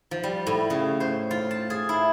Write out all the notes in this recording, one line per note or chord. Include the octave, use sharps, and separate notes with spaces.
F3
G3
A2
C#3
C5
F4
A5
G#4
E4